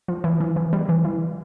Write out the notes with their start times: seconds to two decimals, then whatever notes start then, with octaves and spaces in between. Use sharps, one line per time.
0.08 F3
0.24 E3
0.40 E3
0.56 E3
0.73 G3
0.89 E3
1.05 E3